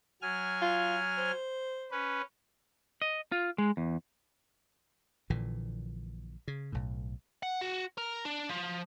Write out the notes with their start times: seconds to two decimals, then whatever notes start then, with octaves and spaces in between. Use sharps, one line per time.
0.22 F#3 G#5 F6
0.62 F4
1.18 C5
1.91 C#4 B4
3.02 D#5
3.32 F4
3.58 G#3
3.77 E2
5.30 A#1 A#2 D3 E3
6.48 C#3
6.72 B1 A2
7.43 F#5
7.61 F#4
7.98 A#4
8.25 D4
8.49 F3